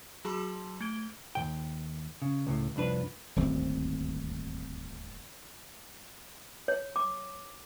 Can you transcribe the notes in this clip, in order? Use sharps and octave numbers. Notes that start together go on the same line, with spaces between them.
F#3 F#4 G#4 A5 C6
A3 G#6 D7 G7
D#2 B2 G5
C#3
C#2 A2
C2 F2 D4 B4
D#1 G#1 D2 C4
C#5
D6